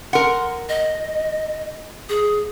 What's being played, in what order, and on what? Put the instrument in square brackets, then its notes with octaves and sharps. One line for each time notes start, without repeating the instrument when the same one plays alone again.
[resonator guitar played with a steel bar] A#4 F#5 [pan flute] C6
[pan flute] D#5
G#4